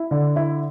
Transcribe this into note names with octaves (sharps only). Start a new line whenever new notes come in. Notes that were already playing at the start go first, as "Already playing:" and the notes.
Already playing: E4
D3
E4